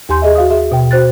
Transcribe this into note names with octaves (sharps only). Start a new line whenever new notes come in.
D#2 G4 G#5 C6 G6
G#4 D#5 E5
F#4 F5 D#6
G#4 E5
B2 G5
F#4 C5 F#6 A6